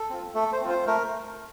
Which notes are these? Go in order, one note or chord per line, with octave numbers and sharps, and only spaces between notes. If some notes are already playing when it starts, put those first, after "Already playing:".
Already playing: A4
C4 F4
A3 A4
C5
C4 F4
C5
A3 A#4